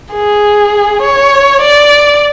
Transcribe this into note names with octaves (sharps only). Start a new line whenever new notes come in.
G#4
C#5
D5